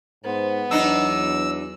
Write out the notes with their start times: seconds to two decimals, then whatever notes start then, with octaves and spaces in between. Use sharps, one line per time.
0.25 G#2 B3 C5
0.71 E2 F#3 D4 D#4 E6